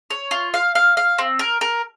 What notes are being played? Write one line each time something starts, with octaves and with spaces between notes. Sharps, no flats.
C#5
F4
F5
F5
F5
C4
A#4
A#4